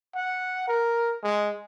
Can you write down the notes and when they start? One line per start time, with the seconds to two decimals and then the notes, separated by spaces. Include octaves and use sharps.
0.15 F#5
0.68 A#4
1.23 G#3